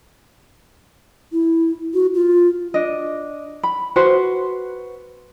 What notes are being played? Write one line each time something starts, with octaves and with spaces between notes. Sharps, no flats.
E4
F#4
F4
D4 D#5
B5
F#4 B4 C5